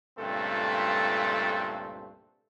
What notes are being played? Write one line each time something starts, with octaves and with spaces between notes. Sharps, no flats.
C#2 G2 A#2 A3 C4 A4